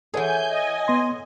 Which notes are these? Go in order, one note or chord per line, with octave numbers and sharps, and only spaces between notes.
E3 G#4 A4 C#5 F#5 G#5 G6
D#5 G#5
B3 C6